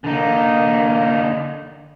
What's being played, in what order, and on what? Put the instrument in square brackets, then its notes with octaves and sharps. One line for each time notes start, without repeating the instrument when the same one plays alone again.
[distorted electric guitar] D3 D#4 [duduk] A#3